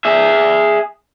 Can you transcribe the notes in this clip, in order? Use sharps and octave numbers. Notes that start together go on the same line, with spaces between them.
G#4 E5